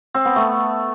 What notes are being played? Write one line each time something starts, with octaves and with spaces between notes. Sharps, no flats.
C4
B3
A3